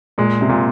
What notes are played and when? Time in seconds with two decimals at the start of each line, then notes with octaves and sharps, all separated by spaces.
0.18 A#2 G#3
0.41 C3
0.49 A#2